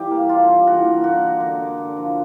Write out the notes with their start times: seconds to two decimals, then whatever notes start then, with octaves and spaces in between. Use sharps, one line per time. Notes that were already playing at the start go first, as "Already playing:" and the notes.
Already playing: E3 G3 G4
0.11 A#3
0.29 D4 F4
0.48 G3
0.67 E3 F#4
0.85 A#3
1.04 D3 F#4
1.22 G#3
1.40 D3
1.59 D3
1.78 D3
1.97 F3